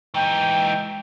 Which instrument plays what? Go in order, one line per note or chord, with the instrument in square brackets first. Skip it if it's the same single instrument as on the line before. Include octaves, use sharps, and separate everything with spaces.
[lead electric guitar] E3 D#4 [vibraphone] G#3 [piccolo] G5